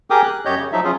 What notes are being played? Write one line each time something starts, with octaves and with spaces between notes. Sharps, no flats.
G4 G#4 A#4 G5 D6 D#6
F#6
F#2 G4 C#5 D#5 G6
C#3
F3 F#3 D#4 E5
F3 F#3 C#4 F4 G#4